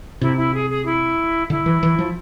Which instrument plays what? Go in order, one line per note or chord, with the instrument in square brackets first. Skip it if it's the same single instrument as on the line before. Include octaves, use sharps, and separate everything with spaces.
[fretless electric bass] C3 [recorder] E4
[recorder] E4
G#4
G#4
E4
[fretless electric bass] D3 [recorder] E4
[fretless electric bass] E3
E3
F3